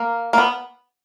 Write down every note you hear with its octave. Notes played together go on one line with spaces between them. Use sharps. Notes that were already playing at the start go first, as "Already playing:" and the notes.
Already playing: A#3
A#3
B3